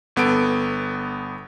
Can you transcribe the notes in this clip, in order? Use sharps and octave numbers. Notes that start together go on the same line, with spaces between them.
G1 B3 A4 D7